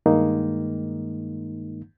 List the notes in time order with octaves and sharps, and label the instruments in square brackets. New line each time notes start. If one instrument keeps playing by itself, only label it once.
[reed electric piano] G2 D#3 G#3 A#3 D#4